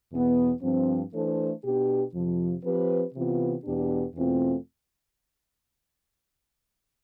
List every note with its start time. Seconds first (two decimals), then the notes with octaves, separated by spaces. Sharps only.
0.12 E2 B2 B3
0.62 G2 F3 C4
1.12 E3 A3 D4 A4 C5
1.63 B2 B3 D4 G4
2.14 F2 C3 F3
2.63 F3 C4 G4 B4
3.15 C3 E3 B3 F4
3.64 E2 B2 B3 D4 G4
4.15 E2 B2 A3 C4 F4